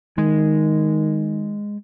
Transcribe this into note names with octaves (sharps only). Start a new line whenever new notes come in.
D#3 G#3